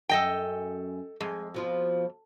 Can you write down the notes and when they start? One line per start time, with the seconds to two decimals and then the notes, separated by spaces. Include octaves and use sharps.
0.09 F#2 A4 D#5 G5
1.21 F2 G#3
1.54 B2 F3 F4